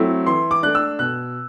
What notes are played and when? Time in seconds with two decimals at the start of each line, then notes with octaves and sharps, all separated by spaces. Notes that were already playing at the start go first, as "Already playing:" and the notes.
Already playing: F#3 A3 C4 E4
0.27 E3 C6
0.51 D6
0.63 A3 D4 F#6
0.75 E6
0.99 B2 F#6